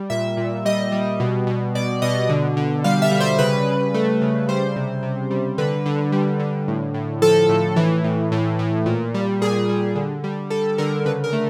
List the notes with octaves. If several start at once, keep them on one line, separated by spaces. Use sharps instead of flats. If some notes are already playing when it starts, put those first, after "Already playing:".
Already playing: G3
A#2 E5
A#2
G3 D#5
G3
B2
B2
B2 D5
B2 D#5
D3
D3
G3 F5
E5
G3
C5
C#3 B4
C#3
A3
C#3
G3 C5
C3
C3
G3
D3 B4
D3
G3
D3
A2
A2
F3 A4
A2
E3
A2
A2
A2
A#2
G3
A#2 G#4
G3
D3
G3
G3 A4
D3 A#4
C#3 B4
A#4
A3